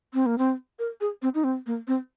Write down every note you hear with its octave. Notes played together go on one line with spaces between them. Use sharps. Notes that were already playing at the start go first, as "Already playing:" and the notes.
C4
A#3
C4
A#4
G#4
C4
D#4
C4
A#3
C4